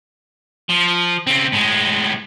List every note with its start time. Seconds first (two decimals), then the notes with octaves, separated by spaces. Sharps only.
0.69 F3
1.27 C#3 C4
1.53 A2 G#3